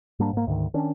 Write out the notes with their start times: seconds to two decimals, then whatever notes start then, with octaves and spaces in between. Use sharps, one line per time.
0.19 G#2 G3 A#3 D4
0.33 G#2 A#3
0.47 D2 G#2 C3 D#3
0.74 D#3 C#4 D4